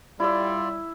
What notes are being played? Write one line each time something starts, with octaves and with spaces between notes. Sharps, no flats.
G3 E4 F4 D5 E5